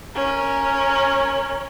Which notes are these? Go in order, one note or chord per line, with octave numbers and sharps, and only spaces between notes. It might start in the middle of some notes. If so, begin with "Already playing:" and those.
C#4 A#4